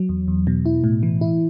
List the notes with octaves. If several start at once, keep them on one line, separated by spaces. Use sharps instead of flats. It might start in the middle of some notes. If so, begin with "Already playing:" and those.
Already playing: F#3
E2
E2
B2
E4
A2
E3
E4